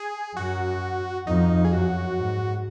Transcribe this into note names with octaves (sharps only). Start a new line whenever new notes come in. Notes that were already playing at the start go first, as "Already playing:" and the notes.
Already playing: G#4
F#2 F#4
F2 D#4
G#4
F#2 F#4
G#2